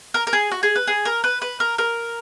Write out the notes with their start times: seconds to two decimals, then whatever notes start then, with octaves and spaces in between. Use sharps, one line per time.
0.14 A#4
0.27 A#4
0.33 G#4
0.51 F#4
0.63 G#4
0.76 B4
0.87 G#4
1.05 A#4
1.24 B4
1.42 B4
1.60 A#4
1.78 A#4